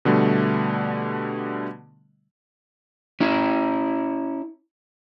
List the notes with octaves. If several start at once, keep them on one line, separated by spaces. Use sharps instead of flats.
B2 D3 G3 A3
C#4 E4